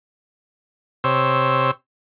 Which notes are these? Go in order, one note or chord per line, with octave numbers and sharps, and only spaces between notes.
C3 C5 C#5 E6